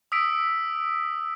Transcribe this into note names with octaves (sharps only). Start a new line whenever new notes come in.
D#6 E6 B6 D7